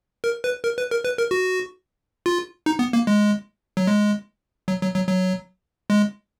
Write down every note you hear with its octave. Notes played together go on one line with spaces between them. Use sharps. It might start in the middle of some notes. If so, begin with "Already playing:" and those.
A#4
B4
A#4
B4
A#4
B4
A#4
F#4
F4
D#4
B3
A#3
G#3
F#3
G#3
F#3
F#3
F#3
F#3
G#3